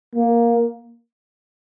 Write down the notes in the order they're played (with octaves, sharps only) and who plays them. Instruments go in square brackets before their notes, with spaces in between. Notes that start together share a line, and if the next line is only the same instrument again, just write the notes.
[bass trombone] A#3